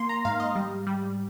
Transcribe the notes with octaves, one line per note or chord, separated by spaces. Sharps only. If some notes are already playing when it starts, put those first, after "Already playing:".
Already playing: A#3 C6
A#5
G#2 F5
D#5
G3
G3